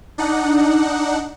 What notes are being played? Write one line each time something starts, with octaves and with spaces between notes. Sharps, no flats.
D4 D#4 F#5